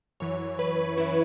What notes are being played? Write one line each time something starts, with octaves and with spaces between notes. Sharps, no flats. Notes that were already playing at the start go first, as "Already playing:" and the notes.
F#2 E3 C#5
B4
F#2 E3 E4